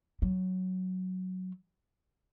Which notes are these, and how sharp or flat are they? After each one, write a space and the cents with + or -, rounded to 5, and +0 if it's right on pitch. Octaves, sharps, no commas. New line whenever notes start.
F#3 +0